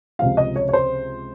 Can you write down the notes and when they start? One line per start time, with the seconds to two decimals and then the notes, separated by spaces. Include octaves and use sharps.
0.19 C#2 C3 F3 F5
0.37 D#5
0.56 C#5
0.69 C#5
0.73 C5